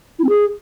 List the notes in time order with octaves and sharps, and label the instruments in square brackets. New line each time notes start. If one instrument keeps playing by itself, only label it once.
[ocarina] E4
C4
G#4